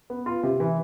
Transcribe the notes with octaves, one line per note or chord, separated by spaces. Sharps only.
B3
F4
C3
E3